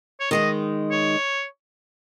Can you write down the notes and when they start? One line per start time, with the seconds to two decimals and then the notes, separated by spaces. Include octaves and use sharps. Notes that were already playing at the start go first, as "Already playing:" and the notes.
0.20 C#5
0.31 D#3 G#3 D#4 D#5
0.91 C#5